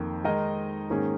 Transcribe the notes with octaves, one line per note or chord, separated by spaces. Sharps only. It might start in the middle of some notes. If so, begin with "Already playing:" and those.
Already playing: F2 D#3 A#3
D#3 G#3 D#4 A#4 D#5
G#2 D#3 A#3 C#4 G#4